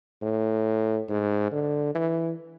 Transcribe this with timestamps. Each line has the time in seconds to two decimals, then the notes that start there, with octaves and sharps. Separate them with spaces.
0.22 A2
1.09 G#2
1.52 D3
1.95 E3